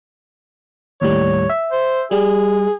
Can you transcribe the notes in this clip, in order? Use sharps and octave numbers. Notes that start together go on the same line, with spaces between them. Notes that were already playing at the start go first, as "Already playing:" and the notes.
D#2 A2 G3 C#5
E5
C5
G3 G#4